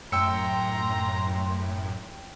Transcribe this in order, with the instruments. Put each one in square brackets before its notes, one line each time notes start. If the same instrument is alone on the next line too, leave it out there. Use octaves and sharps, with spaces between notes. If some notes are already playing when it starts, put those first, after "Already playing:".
[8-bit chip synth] F#2 A2 [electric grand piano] G5 E6 C#7 [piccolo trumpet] A#5 [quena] C6